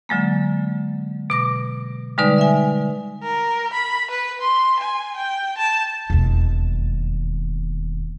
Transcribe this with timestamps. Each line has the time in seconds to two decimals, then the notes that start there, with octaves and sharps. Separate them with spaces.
0.09 D3 F#3 G#3 A#3
1.30 B2 D6 A#6
2.18 D3 G3 G#3 D#4 B4 D5
2.38 E5 G#5
3.22 A#4
3.73 B5
4.11 B4
4.41 C6
4.79 G#5
5.17 G5
5.58 A5
6.10 E1 D#2